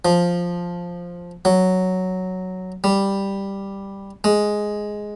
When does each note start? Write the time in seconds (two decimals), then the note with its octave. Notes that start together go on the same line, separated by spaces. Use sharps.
0.05 F3
1.45 F#3
2.84 G3
4.24 G#3